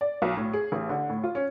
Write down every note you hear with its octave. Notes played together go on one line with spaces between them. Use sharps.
D5
B1
A2
G#4
A1
D3
A2
F4
C#4